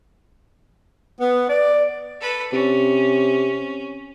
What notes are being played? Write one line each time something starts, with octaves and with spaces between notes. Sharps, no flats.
B3
D5
A4 B4
C3 C#4